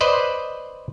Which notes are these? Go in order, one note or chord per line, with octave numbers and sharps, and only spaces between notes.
B4 C5 D5 D#5